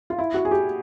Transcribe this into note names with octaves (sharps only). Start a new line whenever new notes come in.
F4
E4
F#4
G#4
G4